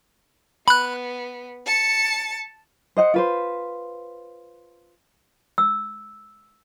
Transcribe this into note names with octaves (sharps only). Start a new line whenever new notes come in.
B3 B5 F#6
A5 C#7
C5 D#5 F#5
F4 B4 C5
E6